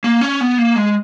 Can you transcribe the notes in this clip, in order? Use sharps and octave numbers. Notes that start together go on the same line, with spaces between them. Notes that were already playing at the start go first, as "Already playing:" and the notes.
A#3
C#4
B3
A#3
G#3